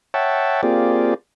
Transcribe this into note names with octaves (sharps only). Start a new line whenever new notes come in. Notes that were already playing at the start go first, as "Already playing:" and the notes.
C#5 E5 F#5 G5 A5
A#3 C4 F4 G4 G#4 D5